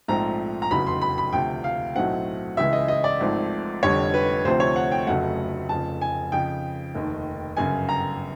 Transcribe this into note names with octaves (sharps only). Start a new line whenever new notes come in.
A#1 G#2 F3 A3 C4 A#5
A#5
F1 E2 C#3 F#3 B5
C6
B5
B5
D2 C3 F3 G5
F5
B1 A2 F#3 A3 C4 F#5
C#2 C#3 E3 G#3 E5
D#5
D#5
D5
G#1 G#2 F3 A3 C4
F1 F2 D3 G3 C#5
B4
D2 C3 F3 A3 C4 C5
C#5
F#5
G5
F1 F2 C#3 F#3 A3 F#5
F1 F2 C#3 F3 A5
G#5
F2 C#3 F3 G5
F1 D#2 D#3
G1 F#2 C#3 G#5
A#5